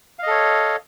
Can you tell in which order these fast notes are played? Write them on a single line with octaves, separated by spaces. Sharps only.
F5 D#5 A4 C#5